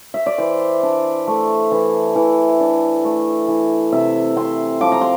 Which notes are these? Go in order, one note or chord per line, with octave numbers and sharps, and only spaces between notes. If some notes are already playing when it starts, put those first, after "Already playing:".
E5
D5
E3 C5
D4
A3
E3
E3
D4
A3
E3
C3 E5
C4 C6
F3 D6
A#5
C6